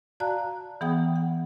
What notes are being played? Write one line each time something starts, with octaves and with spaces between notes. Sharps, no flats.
F#4 D5 F5 A5 A#5 F#6
E3 B3 G#4 F#5 G5 D#6
F#5